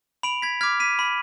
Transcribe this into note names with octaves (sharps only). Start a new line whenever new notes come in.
B5 D7 F7
G#6 B6
D6 F6 G#6 B6
B6 D#7
B5